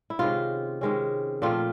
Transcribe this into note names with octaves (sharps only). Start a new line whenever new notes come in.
E4
C3 D#3 G#3 C#4 F4
C3 D#3 G#3 C#4
A#2 F3 A3 C4 F4